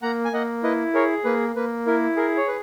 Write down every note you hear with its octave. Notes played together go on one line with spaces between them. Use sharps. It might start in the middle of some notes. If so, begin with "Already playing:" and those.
A#3 F#5 A#5
G#5
A#3 D#5 F#5
E4 B4 D#5
G#4 A#4 C#5
A#3 B4
A#3 B4
E4 A#4
G#4 A#4
C#5
B4